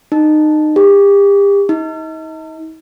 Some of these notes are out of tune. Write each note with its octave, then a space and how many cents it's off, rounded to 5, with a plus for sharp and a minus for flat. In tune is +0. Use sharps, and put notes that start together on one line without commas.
D#4 -25
G4 +35
D#4 +40